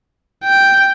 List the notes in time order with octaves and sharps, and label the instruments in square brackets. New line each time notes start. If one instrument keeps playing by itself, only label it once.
[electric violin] G5